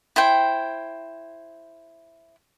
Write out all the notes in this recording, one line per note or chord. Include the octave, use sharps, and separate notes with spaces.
E4 C5 G5